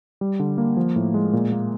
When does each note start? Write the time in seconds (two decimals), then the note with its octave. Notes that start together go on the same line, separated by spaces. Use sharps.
0.21 G3
0.40 D3
0.58 A#3
0.77 F3
0.96 A2
1.14 G#3
1.33 A#2
1.52 A#3